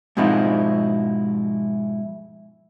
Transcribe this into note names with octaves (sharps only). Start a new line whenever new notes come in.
G#2 B2 F3 C4 D#4 E4